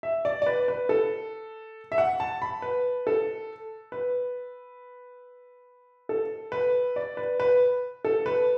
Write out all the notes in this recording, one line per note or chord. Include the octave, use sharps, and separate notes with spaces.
E5
D5
D5
B4
B4
A4
E5
F#5
A5
B5
B4
A4
B4
A4
B4
D5
B4
B4
A4
B4